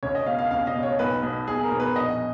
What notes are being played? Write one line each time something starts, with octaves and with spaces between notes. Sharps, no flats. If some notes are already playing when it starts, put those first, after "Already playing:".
C#2 C#5
D#5
B2 F5
F5
C#2 F5
D#5
B2
C#5
B1 B4
B2
B1 G#4
A#4
B2
B4
A#1 D#5